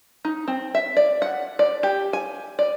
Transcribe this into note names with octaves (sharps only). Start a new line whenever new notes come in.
D#4
C4
E5
D5
F#5
D5
G4
G#5
D5